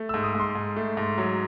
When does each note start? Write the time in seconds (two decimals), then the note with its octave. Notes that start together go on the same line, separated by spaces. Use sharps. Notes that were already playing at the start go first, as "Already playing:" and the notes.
Already playing: A3
0.09 E6
0.14 G#2
0.24 D#6
0.35 G#2 C6
0.55 G#2
0.76 A3
0.97 G#2
1.18 F#3